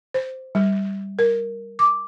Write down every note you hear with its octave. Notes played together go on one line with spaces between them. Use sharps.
C5
G3
A#4
D6